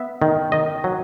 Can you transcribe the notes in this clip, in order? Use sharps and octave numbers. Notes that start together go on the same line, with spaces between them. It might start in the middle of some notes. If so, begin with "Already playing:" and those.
Already playing: B3 E5
D#3
D#3 D#5
F#3